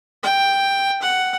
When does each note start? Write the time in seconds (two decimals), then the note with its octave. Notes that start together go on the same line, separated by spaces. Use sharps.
0.23 G5
1.02 F#5